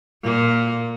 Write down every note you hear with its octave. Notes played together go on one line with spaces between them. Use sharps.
A#2 A#3